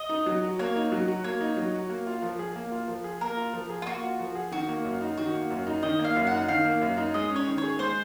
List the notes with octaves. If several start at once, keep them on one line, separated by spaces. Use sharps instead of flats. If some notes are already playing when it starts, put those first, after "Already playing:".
Already playing: D#5
D#4
F#3
F#4
A#3 C#5
D#4
F#3
F#4
A#3 C#5
D#4
F#3
F#4
A#3
F4
F3
G#4
A#3
F4
F3
G#4
A#3 A#4
F4
F3
G#4
F4
A#3 F#4
F4
F3
G#4
D#3 F#4
A#3
F#2
D#4
D#3 F#4
A#3
F#2
D#4
D#3 D#5
A#3
F5
F#2
F#5
D#4
D#3 F5
A#3
F#2
D#4
G#3 D#5
C#4
C#5
D#3
C#5
G#4
G#3 C5